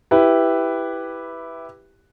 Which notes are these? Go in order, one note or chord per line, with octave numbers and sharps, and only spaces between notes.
E4 G4 B4